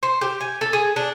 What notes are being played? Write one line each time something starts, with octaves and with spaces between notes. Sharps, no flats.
C5
G4
G#5
A4
G#4
D4